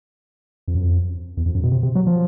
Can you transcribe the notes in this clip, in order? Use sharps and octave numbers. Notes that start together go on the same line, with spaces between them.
F2
F#2
F2
E2
F2
F#2
B2
C3
C3
F#3
F3